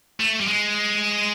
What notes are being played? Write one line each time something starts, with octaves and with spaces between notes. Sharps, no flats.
A3
G3
G#3